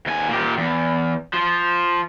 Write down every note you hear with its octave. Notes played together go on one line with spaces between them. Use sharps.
D#2 G#5
A#2 G4
E2
F3